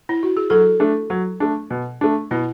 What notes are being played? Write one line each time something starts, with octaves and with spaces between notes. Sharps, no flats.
E4
F#4
G#4
F#3 A4
A3 D4
F#3
A3 D4
B2
A3 D4
B2 E4